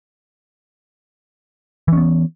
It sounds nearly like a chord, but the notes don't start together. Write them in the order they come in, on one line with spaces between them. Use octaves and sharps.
E3 C#4 B3